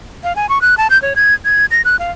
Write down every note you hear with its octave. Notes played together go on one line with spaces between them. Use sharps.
F5
G#5
C#6
F#6
A5
G6
C#5
G#6
G#6
A#6
F#6
F5